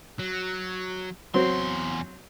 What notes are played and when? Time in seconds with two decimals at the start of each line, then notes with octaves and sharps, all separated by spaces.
0.19 F#3
1.34 E2 F#3 C4 C6